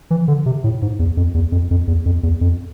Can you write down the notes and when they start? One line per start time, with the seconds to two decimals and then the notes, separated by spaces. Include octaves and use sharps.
0.11 E3
0.28 D3
0.46 C3
0.64 A2
0.82 G#2
0.99 E2
1.17 F2
1.34 E2
1.52 F2
1.71 F2
1.87 E2
2.06 F2
2.23 E2
2.41 F2